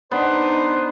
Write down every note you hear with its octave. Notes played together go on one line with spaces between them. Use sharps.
B3 D4 D#4 C5